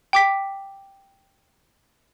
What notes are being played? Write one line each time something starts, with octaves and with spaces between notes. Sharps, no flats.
G5 D6 B6